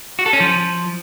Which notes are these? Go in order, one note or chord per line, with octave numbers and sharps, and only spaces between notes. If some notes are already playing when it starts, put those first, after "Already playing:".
F#4
A4
C#4
F3